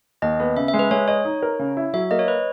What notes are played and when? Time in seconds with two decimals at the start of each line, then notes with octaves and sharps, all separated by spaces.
0.22 D#2 D#5
0.40 B3
0.56 C#3 E5
0.68 E5
0.74 G#3
0.79 B4
0.91 G#3 C#5
1.08 C#5 D#5
1.25 D#4
1.42 A#4
1.59 C#3
1.77 E4
1.93 F#3 E5
2.11 A#3 D#5
2.19 C#5
2.28 B4